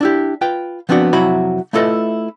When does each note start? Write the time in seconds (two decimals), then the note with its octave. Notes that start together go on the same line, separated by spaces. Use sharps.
0.01 D4 E4 G4
0.41 F4 B4 G5
0.89 F3 B3 C4 D4 F#4
1.13 F2 C3 F#3 E4 F#4 B5
1.73 A3 E4 F4 A4 B4 D#5